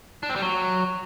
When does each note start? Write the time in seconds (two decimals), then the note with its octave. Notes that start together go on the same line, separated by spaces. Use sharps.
0.23 D4
0.29 C4
0.36 G3
0.42 F#3